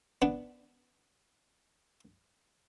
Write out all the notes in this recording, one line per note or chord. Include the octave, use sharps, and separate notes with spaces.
B3 D4